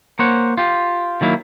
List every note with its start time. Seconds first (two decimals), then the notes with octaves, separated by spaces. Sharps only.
0.19 A#3 C5 C#5 F#5
0.58 F4 G4
1.21 D#3 F#3 A#3 E4